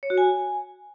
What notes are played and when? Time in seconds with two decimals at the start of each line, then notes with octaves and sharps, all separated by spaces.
0.03 C#5
0.10 F#4
0.18 G#5